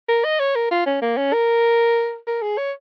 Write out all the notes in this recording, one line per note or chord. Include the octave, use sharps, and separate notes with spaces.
A#4
D#5
C#5
A#4
F4
C#4
A#3
C#4
A#4
A#4
G#4
C#5